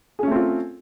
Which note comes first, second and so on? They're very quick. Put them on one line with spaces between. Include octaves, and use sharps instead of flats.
G#4 C#4 A3 C4 F4